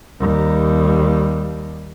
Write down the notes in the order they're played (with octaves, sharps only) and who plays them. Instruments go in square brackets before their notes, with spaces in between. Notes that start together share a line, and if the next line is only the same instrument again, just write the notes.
[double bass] D#2 G3